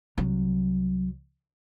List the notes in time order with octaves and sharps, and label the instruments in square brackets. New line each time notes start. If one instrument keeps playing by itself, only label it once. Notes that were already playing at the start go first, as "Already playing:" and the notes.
[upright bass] C2 F#3